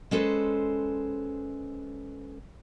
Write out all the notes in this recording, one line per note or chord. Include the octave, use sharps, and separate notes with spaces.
G#3 C#4 A4 B4 C5